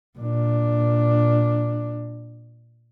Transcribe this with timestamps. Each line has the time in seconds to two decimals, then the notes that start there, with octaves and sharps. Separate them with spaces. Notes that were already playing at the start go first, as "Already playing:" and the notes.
0.19 A#2 D4